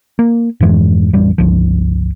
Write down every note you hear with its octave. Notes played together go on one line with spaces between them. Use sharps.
A#3
F2 G#2 E3 G#3
A1 F2 G3
G1 C#2 F3